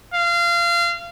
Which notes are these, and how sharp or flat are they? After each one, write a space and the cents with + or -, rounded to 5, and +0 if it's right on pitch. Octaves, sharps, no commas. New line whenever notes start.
F5 -25